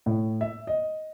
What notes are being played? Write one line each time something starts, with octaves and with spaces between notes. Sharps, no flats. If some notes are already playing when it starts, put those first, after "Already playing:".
A2
E5
D#5